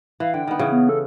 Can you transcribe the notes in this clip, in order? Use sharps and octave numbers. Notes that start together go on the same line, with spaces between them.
E3 F5
D3 G5
D#3 B3
C#3 E3
B3
A4